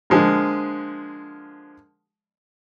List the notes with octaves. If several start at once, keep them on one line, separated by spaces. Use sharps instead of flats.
D3 F3 G#3 A#3